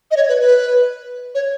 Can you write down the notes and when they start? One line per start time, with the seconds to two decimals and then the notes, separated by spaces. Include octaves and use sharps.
0.11 D#5
0.17 C#5
0.29 B4
0.41 B4
1.35 C#5